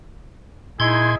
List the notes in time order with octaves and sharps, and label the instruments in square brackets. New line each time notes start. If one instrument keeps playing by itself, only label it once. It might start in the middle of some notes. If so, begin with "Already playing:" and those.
[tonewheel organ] A#2 C6 G#6 [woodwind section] D#4 E4 G#4